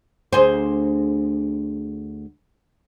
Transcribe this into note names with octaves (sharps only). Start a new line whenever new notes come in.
D2 G#4 C5